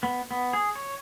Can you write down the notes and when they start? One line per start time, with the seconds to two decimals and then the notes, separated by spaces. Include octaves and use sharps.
0.03 B3
0.31 B3
0.53 G#4
0.75 C#5